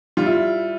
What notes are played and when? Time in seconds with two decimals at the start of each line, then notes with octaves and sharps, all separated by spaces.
0.17 G3 F4
0.26 E4